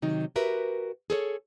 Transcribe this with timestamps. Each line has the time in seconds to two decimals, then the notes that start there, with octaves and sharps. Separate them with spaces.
0.02 C3 D#3 F#3 D#4
0.36 F#4 G4 A#4 B4 E5
1.10 G#4 A4 C5 C#5